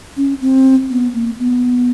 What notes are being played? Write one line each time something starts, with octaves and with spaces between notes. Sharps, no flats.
C#4
C4
B3
A#3
B3